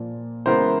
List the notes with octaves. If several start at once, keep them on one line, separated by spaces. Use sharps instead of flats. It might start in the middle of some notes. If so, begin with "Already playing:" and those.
Already playing: A#2 F3 A#3
C#3 E3 G#3 B3 A#4 C5